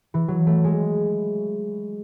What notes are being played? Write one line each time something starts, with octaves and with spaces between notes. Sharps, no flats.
E3
F#3
A3
G#3